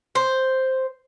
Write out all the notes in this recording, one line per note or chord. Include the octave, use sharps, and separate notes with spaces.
C5